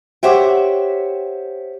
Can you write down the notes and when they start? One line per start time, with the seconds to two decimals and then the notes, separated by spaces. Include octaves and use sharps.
0.23 G4 C5 C#5 E5 F#5 G5